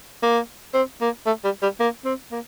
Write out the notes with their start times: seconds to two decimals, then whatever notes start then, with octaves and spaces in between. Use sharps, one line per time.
0.23 A#3
0.74 C4
1.01 A#3
1.26 A3
1.44 G3
1.62 G3
1.80 A#3
2.05 C4
2.32 A#3